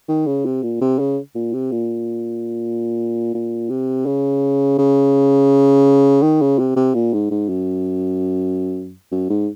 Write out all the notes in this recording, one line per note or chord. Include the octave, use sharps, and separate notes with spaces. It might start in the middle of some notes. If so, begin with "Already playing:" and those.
D#3
C#3
C3
A#2
C3
C#3
A#2
C3
A#2
A#2
C3
C#3
C#3
D#3
C#3
C3
C3
A#2
G#2
G#2
F#2
F#2
G#2